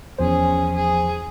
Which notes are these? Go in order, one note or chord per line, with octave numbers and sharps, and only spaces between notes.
E2 F3 C#4 G#4 C5
G#4